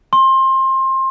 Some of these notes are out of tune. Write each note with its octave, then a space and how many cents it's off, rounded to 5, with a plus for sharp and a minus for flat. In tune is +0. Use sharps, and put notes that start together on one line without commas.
C6 +25